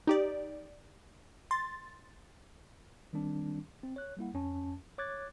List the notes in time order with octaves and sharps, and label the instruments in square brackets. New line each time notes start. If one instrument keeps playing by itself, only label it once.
[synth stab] D#4 G4 D5
C6 A6
[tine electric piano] D#3 G3 C4 D4
C4
C#5 F#6
G3 A#3 E4 F#5
F2 C#4 A5
C#5 D6 F#6 G#6 A6